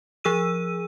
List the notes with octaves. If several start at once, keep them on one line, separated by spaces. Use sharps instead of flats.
F3 G#4 E6 D#7